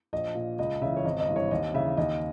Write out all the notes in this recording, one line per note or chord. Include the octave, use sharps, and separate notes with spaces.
A#1 D#5
A#2
C#2 D#5
C#3 E3 E5
C#5
G#1 D#5
D#5
G2 E3
C#5
D#2 D#5
C#3 E3 E5
D#2 D#5